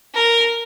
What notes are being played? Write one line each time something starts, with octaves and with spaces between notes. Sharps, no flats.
A#4